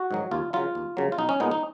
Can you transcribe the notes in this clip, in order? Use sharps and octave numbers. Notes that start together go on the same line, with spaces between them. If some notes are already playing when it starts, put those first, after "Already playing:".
Already playing: F#4
G#2 D#3 F#3
D#2 F4
C#3 F#3 F4
D#2
C#3 F#3 A#3
F4
B1 D#4
C#4
A#2 G#3 B3 D#4
D#4